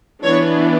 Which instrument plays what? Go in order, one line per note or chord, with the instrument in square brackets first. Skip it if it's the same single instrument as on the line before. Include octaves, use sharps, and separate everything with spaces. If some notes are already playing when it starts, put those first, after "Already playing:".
[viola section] E3 B3 D4 C#5